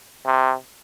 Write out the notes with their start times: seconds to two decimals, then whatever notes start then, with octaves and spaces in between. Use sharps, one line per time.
0.26 C3